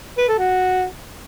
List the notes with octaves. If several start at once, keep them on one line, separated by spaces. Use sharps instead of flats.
B4
A4
F#4